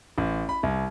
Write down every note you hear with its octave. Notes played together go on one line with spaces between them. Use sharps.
A1
B5
C2